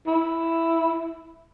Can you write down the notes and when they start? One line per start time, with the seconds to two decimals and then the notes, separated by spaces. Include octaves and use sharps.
0.07 E4